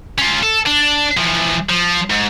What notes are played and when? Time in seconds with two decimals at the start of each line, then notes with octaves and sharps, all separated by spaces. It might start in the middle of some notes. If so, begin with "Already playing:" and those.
0.19 C#4 F4
0.43 A4
0.66 D4
1.17 E3 F3
1.70 F3
2.10 G#2